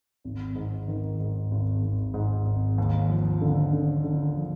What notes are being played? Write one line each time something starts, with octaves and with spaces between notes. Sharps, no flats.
G#1
G#2
D#3
G#2
G#1
G#1
G#2
G#1
D#2
F3
D3
D3
D3
F3